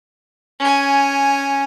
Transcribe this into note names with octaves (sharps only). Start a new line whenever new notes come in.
C#4 G#5